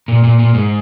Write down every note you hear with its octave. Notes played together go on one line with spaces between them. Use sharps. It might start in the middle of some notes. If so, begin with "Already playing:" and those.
A#2
A#2
A#2
G#2